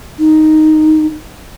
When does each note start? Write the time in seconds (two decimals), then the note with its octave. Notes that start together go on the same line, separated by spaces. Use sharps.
0.19 D#4